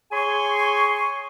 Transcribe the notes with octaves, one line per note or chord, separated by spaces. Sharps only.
G#4 C#5 G#5 C6 C#6